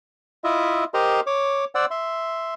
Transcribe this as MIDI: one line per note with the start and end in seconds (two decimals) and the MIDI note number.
0.44 0.84 64
0.44 0.84 65
0.44 0.84 75
0.44 0.84 76
0.94 1.20 67
0.94 1.20 70
0.94 1.20 72
0.94 1.20 75
0.94 1.20 82
0.94 1.20 84
1.27 1.65 73
1.27 1.65 86
1.75 1.86 72
1.75 1.86 74
1.75 1.86 78
1.75 1.86 88
1.91 2.54 76
1.91 2.54 84